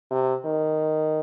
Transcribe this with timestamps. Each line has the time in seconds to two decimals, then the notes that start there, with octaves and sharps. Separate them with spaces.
0.11 C3
0.45 D#3